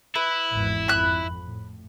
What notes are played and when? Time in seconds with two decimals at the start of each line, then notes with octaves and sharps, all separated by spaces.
0.16 E4 B4
0.49 G#1 E2
0.88 F2 B5 F#6
1.46 A2